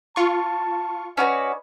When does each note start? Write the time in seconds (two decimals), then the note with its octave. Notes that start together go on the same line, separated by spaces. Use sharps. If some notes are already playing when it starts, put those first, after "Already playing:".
0.16 F4 A5 C#6
1.17 C#4 F#4 B4 D5 D#5 G#5